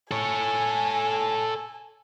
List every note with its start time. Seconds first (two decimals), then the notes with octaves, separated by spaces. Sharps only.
0.11 A4 C#5 G#5